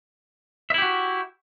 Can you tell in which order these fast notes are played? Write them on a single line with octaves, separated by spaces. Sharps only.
E5 E4 G4 F#4